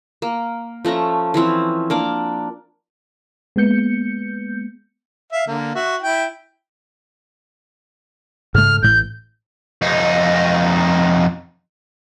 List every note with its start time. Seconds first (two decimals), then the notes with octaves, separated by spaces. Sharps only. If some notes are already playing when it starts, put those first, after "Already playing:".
0.22 A#3
0.85 F3 A3 C#4 A#5
1.34 E3 F3 C4 C#4
1.90 A#3 D4 D6
3.56 G#3 A#3 B3 G6 C#7
5.33 E5 F5
5.47 D3 A#3
5.75 F#4 E5
6.02 E4 G5
8.55 G#2 C#3 A3 F6
8.82 A1 A2 G6
9.82 F2 D#4